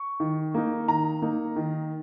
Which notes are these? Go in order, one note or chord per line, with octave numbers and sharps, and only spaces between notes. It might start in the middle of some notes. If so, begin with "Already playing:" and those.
Already playing: C#6
D#3
A#3 D#4
D#3 A#5
A#3 D#4
D#3